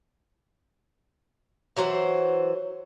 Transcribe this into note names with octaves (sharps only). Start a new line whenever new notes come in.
E3 F#3 C5 F#5